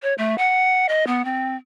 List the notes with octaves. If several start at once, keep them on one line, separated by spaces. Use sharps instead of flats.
C#5
A3
F#5
D#5
B3
C4